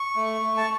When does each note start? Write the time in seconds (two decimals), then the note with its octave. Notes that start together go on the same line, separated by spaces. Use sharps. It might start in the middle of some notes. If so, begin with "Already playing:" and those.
Already playing: C#6
0.16 A3
0.41 A3
0.57 A5